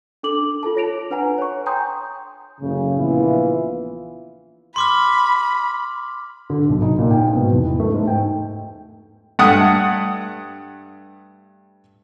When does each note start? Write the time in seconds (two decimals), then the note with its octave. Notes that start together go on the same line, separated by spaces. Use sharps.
0.23 D4 A4 D6 F#7
0.63 F4 A4 A5
0.75 A4 C#5 A#6 D7 F7
1.11 D4 B4 F#5 G#5 A#5
1.38 C#5 C#6
1.66 G5 G#5 A#5 C6 D#6 G6
2.61 F#1 A2 C#3
2.98 A#1 E3 B3 E4 F4
4.76 B5 C6 D6 F6
6.50 D3
6.69 B1
6.82 D#4
6.99 A#2
7.11 G5
7.23 G#2
7.36 B2
7.52 E2
7.65 E4
7.80 A3
7.94 G#2
8.07 G5
9.39 G2 A3 F#5 D#6